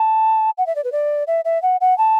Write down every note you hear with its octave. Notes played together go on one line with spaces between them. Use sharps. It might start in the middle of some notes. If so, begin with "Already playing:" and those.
Already playing: A5
F#5
E5
D5
B4
D5
E5
E5
F#5
F#5
A5